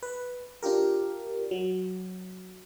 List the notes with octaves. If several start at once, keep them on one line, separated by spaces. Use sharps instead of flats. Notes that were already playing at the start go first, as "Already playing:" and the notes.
B4
D4 F4 G4 A#4
F#3